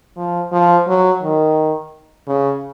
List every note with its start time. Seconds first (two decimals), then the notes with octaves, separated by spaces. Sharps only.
0.17 F3
0.52 F3
0.87 F#3
1.22 D#3
2.27 C#3